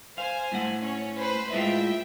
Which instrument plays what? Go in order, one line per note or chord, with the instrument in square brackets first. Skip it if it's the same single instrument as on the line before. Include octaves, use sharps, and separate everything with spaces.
[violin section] C5 G#5 [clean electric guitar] F5
[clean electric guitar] A2 A3 F#5
[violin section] C#4 C#5
B4 C5 B5
[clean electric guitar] A2 G#3 F4 [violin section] E5 G5